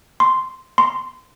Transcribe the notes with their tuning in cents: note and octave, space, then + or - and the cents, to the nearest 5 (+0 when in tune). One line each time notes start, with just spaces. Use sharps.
C6 -5
C6 -15